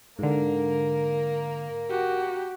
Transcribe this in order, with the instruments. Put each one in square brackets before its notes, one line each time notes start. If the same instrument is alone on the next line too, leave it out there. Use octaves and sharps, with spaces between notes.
[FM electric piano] G#2 D3 [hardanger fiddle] A#3 A#4
[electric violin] F#4 G4